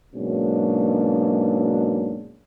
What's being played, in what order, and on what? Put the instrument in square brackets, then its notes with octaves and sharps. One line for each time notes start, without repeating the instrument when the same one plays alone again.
[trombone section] G#2 B2 F#3 A#3 C#4 D4